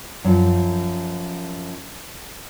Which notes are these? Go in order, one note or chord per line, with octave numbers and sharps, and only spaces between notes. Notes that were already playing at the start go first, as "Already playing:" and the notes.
F#2 F3